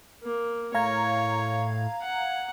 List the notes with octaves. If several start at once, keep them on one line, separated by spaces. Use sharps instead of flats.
A#3
A2 C#5 F5 A#5 G#6
F#5